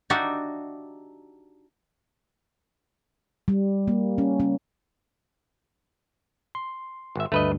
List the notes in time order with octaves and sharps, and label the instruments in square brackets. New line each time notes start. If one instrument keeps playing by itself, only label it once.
[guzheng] D4 D#4 F#4 G4 D5 E5
[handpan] G3
A#3
C#4
C#4
[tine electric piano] C6
[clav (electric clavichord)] G#1 E5
[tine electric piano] D2 G2 [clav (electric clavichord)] A3 B4 D#5